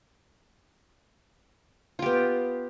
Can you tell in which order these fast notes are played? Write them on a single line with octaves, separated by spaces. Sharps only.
F4 G4 B3